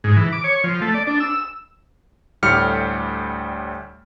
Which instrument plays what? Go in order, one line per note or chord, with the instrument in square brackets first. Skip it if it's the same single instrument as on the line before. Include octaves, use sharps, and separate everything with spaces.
[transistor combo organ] G#2
E3
D6
C#5
F3
A3
D5
D4
E6
[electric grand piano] D2 A2 G3 G4 F6 C#7